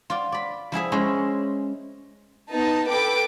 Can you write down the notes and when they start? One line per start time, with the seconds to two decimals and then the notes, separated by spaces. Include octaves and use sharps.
0.10 F4 D5
0.32 D5 B5
0.72 F3 E4 G#4 E5
0.92 G#3 C#4 E4 C5
2.51 B3 D#4 A5
2.90 A4 B4 G5 D6